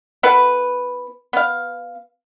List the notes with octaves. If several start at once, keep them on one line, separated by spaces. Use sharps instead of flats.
B3 E4 A4 B4
B3 F5